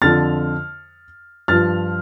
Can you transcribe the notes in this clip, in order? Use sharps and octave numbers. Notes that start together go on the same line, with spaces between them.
F2 D3 F3 F6 A6
G2 F3 F6 A6